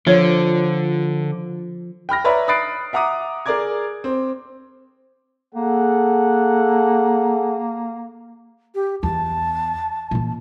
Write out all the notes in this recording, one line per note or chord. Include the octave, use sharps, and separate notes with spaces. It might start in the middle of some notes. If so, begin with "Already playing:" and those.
D3 F3 F4 C#5
G5 B5 F6 A#6
B4 C#5 D5 E5 A#5 B5
B5 D#6 F#6 A6 C7 D7
E5 F#5 A#5 D6 D#6
G#4 A#4 D5 A#5 D6 G#6
C4
A#3 G#4 A4 F#5
G4
E2 A5
A#2 E3